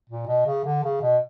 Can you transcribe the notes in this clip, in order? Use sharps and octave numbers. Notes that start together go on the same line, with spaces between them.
A#2
B2
C#3
D3
C#3
B2